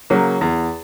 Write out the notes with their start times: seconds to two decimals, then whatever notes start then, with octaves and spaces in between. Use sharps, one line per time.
0.10 C#3 F#3 A#3
0.41 E2